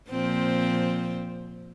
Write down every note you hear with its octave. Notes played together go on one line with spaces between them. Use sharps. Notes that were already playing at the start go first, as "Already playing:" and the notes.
A#2 F3 C4